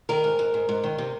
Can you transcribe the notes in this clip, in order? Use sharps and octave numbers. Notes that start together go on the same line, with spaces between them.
D#3 A#4
G#2
G#2
G#2
G#2
D#3
C3